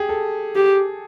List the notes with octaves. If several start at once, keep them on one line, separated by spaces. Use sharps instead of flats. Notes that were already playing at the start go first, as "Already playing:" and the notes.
Already playing: G4 G#4
A4
G4